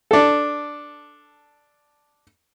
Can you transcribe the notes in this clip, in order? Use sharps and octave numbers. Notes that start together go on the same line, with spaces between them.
D4 A4